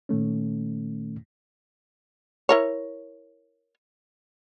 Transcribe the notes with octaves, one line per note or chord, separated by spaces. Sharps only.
A#2 D#3 A3 C#4
E4 A#4 C#5